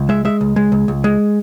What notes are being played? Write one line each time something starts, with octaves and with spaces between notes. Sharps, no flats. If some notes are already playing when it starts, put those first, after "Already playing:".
Already playing: C#2
G#3 E5
G#3 E5
C#2
G#3
C#2
C#2
G#3